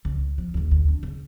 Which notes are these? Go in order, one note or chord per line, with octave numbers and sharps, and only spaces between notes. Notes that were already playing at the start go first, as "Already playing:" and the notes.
C#2
F3
D2 C#3
D2
D4
C#3